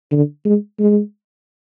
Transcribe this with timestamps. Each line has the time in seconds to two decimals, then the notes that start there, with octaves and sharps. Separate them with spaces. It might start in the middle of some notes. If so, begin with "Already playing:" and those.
0.12 D3
0.45 G#3
0.79 G#3